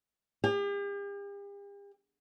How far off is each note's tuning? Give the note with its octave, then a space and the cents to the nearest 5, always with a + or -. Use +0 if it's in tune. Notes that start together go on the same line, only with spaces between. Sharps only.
G4 +45